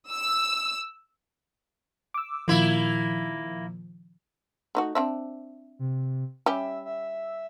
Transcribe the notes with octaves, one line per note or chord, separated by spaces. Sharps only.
E6
D6 E6
A#2 D#3 F3 A#3 E4
A3 D#4 F#4
C4 D4 E5
C3
G3 C#4 G4 E5
E5